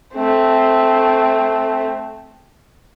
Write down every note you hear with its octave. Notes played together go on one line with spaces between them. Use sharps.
A3 C4